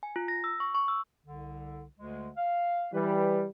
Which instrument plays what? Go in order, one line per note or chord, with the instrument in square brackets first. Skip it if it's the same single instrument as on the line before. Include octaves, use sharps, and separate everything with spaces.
[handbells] G#5
F4
A#6
E6
C#6
C#6
E6
[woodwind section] C2 D3
D2 D3 G#3
F5
[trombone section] E3 G3 [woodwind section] B4